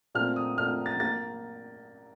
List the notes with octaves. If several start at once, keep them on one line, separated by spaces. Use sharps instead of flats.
A#2 A3 C4 F6
D#6
A#2 A3 C4 F6
A6
A#3 A6